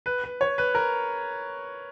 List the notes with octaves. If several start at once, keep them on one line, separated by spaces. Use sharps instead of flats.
B4
B4
C#5
B4
A#4